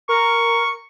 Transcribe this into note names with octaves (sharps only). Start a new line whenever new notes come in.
A#4 C#6